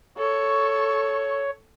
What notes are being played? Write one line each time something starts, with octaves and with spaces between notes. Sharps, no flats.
A4 C#5 C#6